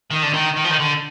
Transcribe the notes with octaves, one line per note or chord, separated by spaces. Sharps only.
D#3
D3
D#3
D#3
F3
D#3
D3